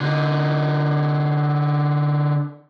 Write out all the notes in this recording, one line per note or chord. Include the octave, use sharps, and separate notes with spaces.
D3 D#4